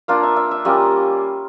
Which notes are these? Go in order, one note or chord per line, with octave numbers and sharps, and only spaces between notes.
A#3 D4 F4 F5
E5
E5
E5
G3 A#3 C#4 F4 D#5